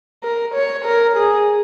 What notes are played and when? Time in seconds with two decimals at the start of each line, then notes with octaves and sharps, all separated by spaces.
0.24 A#4
0.55 C#5
0.85 A#4
1.17 G#4